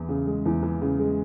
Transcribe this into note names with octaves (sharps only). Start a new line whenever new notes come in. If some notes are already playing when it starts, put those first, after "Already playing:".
Already playing: E2 E3
C#3
G#3
E2
E3
C#3
G#3